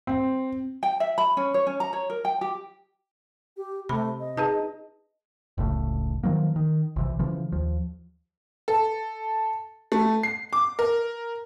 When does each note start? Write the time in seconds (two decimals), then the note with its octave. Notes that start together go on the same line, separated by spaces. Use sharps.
0.07 C4
0.83 G5
1.00 E5
1.18 B5
1.37 C#4
1.54 C#5
1.67 C#4
1.80 A#5
1.93 C#5
2.10 A#4
2.25 G5
2.41 G4
3.57 G4
3.89 C3 A3 B5
4.20 D#5
4.37 D#4 G#4 B4 A5
5.58 F1 C#2 A2 C#3
6.23 D#3 F3 F#3 A#3
6.56 D#3
6.96 A#1 C3 E3
7.19 C#3 E3 F3
7.52 D#2 F3
8.68 A4
9.92 A3
10.23 C7
10.53 D6
10.79 A#4